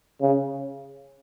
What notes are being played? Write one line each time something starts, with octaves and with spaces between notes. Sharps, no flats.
C#3